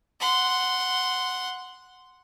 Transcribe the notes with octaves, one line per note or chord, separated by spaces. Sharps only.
F#5 C6